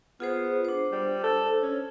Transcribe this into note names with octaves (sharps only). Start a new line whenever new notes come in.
B3 F4 G#4 C5
D4 C5
G3
A4
C#4